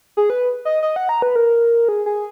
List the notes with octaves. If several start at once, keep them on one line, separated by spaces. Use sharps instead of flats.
G#4
B4
D#5
D#5
F#5
A#5
B4
A#4
G#4
G#4